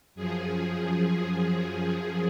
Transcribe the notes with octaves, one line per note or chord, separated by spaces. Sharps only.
F#2 F3 G#4